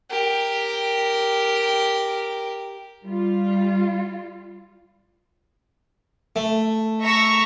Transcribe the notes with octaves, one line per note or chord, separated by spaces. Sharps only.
G4 A#4
G3 F4
A3
E5 A#5 C#6